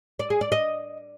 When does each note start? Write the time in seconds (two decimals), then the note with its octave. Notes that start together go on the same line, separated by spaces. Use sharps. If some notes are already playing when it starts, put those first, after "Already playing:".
0.19 D5
0.30 G#4
0.41 D5
0.52 D#5